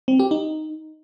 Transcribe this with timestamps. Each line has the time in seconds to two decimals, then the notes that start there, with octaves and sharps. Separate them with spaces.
0.08 C4
0.20 G4
0.31 D#4